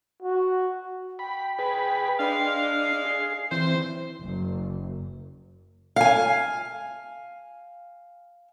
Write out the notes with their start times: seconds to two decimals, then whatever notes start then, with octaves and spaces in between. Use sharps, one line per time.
0.22 F#4
1.19 G5 B5
1.59 G#4 B4 B5
2.19 G#3 D4 F5
2.85 C7
3.05 G#4
3.51 E3 C4 C5
4.22 F#1
5.96 F5 G#5